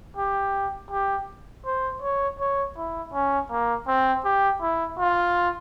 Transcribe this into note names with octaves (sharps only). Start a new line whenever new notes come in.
G4
G4
C5
C#5
C#5
E4
C#4
A#3
C4
G4
E4
F4